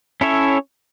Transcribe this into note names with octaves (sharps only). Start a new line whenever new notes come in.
C#4 E4 A4 C#5 E5